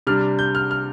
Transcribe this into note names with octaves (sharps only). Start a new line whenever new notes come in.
C3 G3 D4 F6
G6
F6
F6